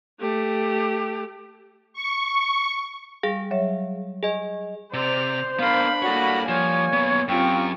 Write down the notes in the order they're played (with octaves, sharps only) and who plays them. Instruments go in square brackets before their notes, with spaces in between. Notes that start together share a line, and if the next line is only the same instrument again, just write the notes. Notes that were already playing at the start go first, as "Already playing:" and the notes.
[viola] A3 G4
[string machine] C#6
[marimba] G3 [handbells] G#4 F5
[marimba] F#3 C#5 E5
[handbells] G#4 D#5 [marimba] G#5
[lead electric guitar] C3 [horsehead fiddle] C5 [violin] D5 F7
[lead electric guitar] B3 A#4 [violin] D4 B5 [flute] F5
[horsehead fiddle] G3 A#3 [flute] F#4 [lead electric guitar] A4 C#5
[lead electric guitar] F3 [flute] C#5 [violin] G#5
[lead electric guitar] F#2 B3
[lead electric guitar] F#2 [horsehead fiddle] C4 F4 [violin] G4 C#6 [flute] G5